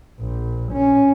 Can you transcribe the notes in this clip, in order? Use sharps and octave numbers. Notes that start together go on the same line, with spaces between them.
A#1
C#4